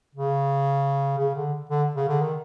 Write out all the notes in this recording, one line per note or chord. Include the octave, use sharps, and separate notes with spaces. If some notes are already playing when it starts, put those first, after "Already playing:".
C#3
C#3
D3
D3
C#3
D3
D#3